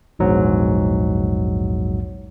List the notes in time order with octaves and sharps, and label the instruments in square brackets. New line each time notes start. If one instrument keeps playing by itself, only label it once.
[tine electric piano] A#1 E2 G#2 F#3